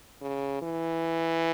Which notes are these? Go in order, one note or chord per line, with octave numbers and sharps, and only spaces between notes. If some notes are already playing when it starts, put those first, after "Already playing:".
C#3
E3